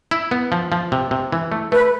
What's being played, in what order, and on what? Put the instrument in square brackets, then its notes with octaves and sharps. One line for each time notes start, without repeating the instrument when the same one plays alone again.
[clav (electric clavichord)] E4
B3
F3
F3
C3
C3
E3
A3
[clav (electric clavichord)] A3 [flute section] B4